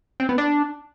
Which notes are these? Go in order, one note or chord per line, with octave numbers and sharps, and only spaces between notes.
C4
B3
D4